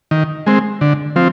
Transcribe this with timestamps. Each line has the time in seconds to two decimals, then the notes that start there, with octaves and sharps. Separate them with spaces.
0.11 D#3
0.47 G#3 C4
0.81 D3
1.16 F3 C4